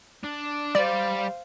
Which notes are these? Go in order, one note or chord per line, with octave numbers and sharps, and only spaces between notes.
D4
G3 C5 D5 F5